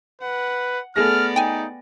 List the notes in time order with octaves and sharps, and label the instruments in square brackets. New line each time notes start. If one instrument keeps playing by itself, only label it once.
[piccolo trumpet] B4 [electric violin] F#5
[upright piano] A3 G#4 A#6 [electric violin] B3 D5 [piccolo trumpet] F6
[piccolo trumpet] D#4 [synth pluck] G5 G#5